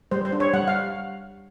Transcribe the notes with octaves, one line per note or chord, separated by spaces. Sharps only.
G3 C5
C5
D4
C#5
G3 F#5
F5